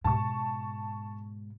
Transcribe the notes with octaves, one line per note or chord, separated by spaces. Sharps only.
G#2 B2 A5 C#6